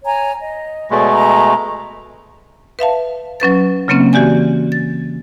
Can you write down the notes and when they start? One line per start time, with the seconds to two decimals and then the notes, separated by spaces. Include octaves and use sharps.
0.04 C#5 G#5 A#5
0.39 D#5
0.91 B2 G#3 A3 C#5 D5
1.12 D#5 A#5
2.79 B4 E5 F5 A5
3.40 F#3 C#4 B4 A6
3.88 C#3 F#3 A#3 C4 C#4
4.13 E3 F#4 G4 D5 G#5
4.72 A6